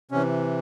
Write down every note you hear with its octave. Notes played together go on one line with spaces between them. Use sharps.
C3 E3 C#4